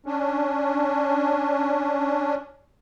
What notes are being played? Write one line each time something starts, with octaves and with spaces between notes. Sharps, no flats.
C#4 D4